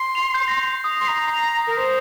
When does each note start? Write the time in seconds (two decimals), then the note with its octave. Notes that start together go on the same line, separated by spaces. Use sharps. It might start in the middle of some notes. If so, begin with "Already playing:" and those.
Already playing: C6
0.15 F7
0.34 G6
0.48 A#6
0.62 C7
0.84 D#6
1.00 C6
1.08 A#5
1.67 A#4
1.77 C5